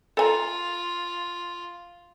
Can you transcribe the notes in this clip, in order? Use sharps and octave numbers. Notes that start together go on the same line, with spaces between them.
F4 A4 G#5 A#5